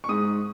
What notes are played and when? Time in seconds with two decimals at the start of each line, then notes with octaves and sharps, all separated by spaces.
0.04 C#6
0.09 G#2 D#6